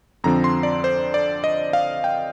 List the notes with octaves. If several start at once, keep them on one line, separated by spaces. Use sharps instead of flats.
F2 D3 F3 C4 A#5
C6
D5
C5
D5
D#5
F5
G5